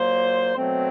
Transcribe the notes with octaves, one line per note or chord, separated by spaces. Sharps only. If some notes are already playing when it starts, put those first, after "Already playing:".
Already playing: A#2 F#3 A#3 C5
B2 F#3 A3 C4